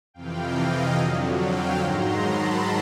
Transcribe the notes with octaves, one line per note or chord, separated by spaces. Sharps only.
F2 C3 E3 F5 G5
D#5 F5
F2 D3 F#3
F5 G5
G#2 D#3 F#3 A#5 C6
A5 B5